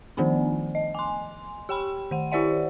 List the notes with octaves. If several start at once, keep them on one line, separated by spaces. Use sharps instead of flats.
D#3 F3 A3 B3 D4
D#5
G#5 C6
G4 G5 B5
D#3 F#5
E4 G4 C5 D5 E5 F#5